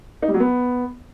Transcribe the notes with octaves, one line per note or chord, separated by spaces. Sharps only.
D#4
G3
F#3
B3